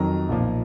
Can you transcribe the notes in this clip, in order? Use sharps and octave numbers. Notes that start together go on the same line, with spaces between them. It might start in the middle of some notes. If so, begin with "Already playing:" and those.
Already playing: F2 D#3 F#3 A#5
B1 A#2 F3